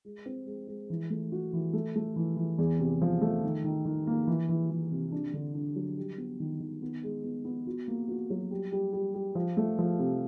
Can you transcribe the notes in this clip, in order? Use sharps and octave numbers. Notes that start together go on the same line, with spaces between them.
G#3
C4
G#3
G#3
E3
A3
F#4
E3
A3
A3
E3
E3
E2
C3
F3
A3
D#3
D#3
D#3
A#3
E3
E3
E3
C3
D4
D3
D4
F#3
G3
B3
D#3
D#3
B3
G#3
B3
B3
F#4
A#3
F#4
F#3
G3
G3
G3
G3
F3
A3
F3
C3